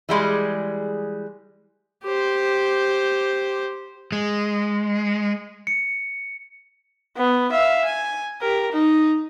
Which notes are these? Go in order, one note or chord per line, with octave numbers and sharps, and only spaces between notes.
E3 G3 G#3 G#4
G4 C5
G#3
C#7
B3
E5 F5
G#5
G4 A#4
D#4